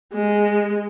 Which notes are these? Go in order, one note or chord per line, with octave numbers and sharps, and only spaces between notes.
G#3